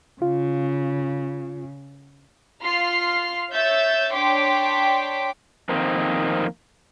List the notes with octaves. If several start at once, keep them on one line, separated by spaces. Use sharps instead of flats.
C#3 F4
F4 C6 F6 C7
C#5 E5 E6 G6 A6
D4 C#5 G5 C6 D6 B6
F2 D#3 A#3 C4